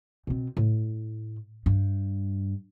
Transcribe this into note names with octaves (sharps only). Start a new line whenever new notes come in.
B2 C4
A2
G2